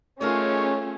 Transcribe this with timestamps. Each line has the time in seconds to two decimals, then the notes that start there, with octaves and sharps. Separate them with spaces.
0.21 A3 C#4 D#4 F4 G#4 A#4 C#5